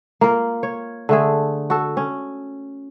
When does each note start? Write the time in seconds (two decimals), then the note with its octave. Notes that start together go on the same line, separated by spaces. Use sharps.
0.21 A#3 F4 A#4
0.63 C#5
1.09 D3 A3 G#4
1.70 F#4 A4
1.97 C#4